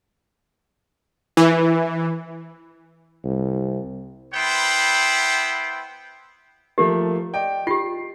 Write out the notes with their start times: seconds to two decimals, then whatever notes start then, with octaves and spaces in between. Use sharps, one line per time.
1.37 E3
3.24 C2
4.34 B3 E4 C5 G5
6.78 F3 A3 A#3 G4
7.34 D5 D#5 G5
7.67 F4 G4 C7